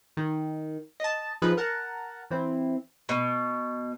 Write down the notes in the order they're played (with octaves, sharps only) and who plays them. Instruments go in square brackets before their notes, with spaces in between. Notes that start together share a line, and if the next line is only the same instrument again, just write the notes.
[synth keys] D#3
D#5 A5
F3 D#4 G#4 B4
A#4 F#5 A5 A#5
E3 C4 E4
[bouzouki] B2